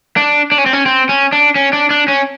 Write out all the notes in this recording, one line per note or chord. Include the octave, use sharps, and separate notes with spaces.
D4
D4
C#4
C4
C#4
C4
C#4
D4
C#4
D4
D4
C#4